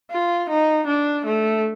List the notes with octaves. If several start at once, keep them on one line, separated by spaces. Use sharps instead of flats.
F4
D#4
D4
A3